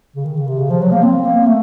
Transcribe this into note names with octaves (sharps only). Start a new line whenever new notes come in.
C#3
D#3
C#3
C3
C#3
F3
F#3
A#3
C4
A#3
A3